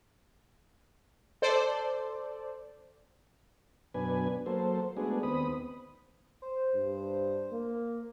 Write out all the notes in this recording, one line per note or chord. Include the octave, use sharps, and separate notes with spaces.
A4 C5 D5
F#2 B2 D4 B4 G#5
F#3 A#3 A4 C5
G#3 A3 B3 D4 F#4 G#4
D#2 B3 C4 B5 D#6
C5
G2
A#3